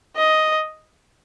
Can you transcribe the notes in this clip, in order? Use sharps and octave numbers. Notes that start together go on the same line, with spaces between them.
D#5